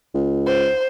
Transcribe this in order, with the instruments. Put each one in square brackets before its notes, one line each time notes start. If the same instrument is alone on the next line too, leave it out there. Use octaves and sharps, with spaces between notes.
[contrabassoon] C#2
[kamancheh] C5